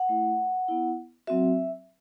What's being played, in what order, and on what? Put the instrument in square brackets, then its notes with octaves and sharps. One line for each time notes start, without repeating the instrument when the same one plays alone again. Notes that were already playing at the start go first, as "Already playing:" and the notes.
Already playing: [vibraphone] F#5
A3 E4
B3 E4
F#3 C4 F#4 E5